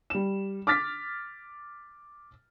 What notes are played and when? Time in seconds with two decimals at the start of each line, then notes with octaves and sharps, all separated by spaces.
0.10 G3 E7
0.67 D6 F6 A6 B6